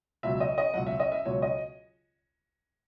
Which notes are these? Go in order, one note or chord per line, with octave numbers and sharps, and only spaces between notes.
C#2 B2 F#3 E5
D#5
D#5
C#2 B2 F#3 F#5
E5
D#5
E5
C#2 B2 F#3 C#5
D#5